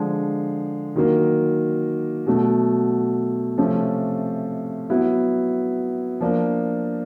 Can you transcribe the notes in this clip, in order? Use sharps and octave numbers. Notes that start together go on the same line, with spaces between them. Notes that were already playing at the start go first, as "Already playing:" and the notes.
Already playing: D3 F3 G#3
D#3 F#3 A#3
B2 F#3 A3
C3 F3 A3 C#4
F#3 B3 E4
F3 A#3 D4